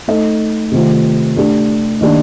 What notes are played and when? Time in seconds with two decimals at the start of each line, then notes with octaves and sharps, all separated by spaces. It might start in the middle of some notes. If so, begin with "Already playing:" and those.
0.08 A3 D#4 A4 D#5
0.72 C3 D#3 A3 C4 F4
1.36 A3 D4 G4
2.01 D#3 A#3 D4 G4